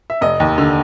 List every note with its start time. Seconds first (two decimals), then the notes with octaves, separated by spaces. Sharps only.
0.10 E5
0.21 F1 D#5
0.40 D#2
0.58 D3